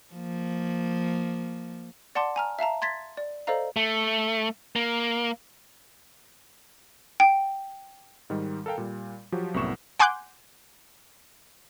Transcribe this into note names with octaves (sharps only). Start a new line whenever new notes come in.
F3 A#3
D5 F#5 A5 C6 D6
G#5 A#5 F6
E5 F5 A5 A#5
C6 G#6 A6 B6
D5
A4 C5 D5 D#5 F5 A#5
A3
A#3
G5
G#2 D#3 G3
A4 A#4 F5 G5
A#2 G3
F3 F#3 F#4 G4
C2 F#2 A2 B3 C#6 E7
F#5 G#5 C6 D6 F#6 G6